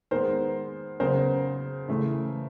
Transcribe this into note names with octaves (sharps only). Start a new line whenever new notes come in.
D#3 G#3 B3 A#4 C5
C#3 F#3 B3 A#4 C5
C#3 E3 A3